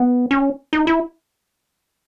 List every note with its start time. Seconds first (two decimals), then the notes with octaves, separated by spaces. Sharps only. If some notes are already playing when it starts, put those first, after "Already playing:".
Already playing: B3
0.31 C#4
0.73 D#4
0.87 E4